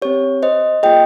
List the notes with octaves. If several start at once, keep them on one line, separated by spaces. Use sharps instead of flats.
C4 G4 C#5
C5 D#5
A#3 F4 G#4 D#5 G5